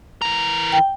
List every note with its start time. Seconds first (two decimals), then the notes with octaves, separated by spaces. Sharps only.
0.22 E3 A#4
0.72 G5